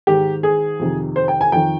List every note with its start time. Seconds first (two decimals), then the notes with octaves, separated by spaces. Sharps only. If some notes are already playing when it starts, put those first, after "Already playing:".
0.07 G#2 D#3 G4
0.43 G#4
0.79 F2 C3 D#3
1.16 C5
1.28 G5
1.41 G#5
1.52 F2 D#3 G5